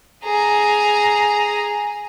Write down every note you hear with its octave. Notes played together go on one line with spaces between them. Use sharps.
G#4 A#5